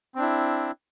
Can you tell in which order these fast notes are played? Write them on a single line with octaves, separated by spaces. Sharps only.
C4 D4 E4